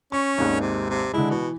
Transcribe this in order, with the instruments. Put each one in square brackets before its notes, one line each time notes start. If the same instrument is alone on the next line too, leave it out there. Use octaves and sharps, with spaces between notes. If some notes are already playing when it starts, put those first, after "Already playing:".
[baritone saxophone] C#4 [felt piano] C#6
[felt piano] G#1 D#2 G#3
[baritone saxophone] C3
C3
[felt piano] D3 E3 G#3 [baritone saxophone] E4
[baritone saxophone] B2 [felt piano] E3